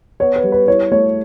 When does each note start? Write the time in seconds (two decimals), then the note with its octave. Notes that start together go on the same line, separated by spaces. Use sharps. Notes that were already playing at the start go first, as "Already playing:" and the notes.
0.20 B3 C#5
0.36 B4
0.44 G3
0.52 B4
0.68 E4 C#5
0.91 A3 C#5